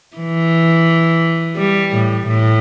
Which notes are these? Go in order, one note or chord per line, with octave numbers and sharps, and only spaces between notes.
E3
G3
A2
A2